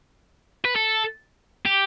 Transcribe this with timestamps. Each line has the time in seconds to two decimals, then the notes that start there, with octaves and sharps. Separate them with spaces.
0.65 B4
0.76 A4
1.66 G4